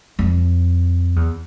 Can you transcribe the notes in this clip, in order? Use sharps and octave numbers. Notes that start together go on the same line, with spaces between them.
F2
E2